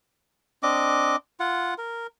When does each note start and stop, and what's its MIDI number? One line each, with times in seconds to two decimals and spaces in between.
0.63 1.16 60
0.63 1.16 62
0.63 1.16 75
0.63 1.16 86
1.40 1.74 65
1.40 1.74 78
1.78 2.07 70